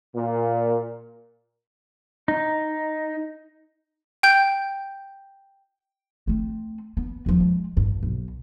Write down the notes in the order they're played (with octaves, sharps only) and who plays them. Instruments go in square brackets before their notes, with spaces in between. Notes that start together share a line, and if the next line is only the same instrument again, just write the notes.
[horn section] A#2
[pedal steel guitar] D#4
[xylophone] G5 G6
[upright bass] A3 C4
B3
E2 F3
G#3
A1 G2
B1